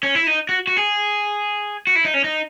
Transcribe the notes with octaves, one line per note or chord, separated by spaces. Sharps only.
C#4
E4
D#4
F#4
F#4
G#4
F#4
E4
D#4
C#4
D#4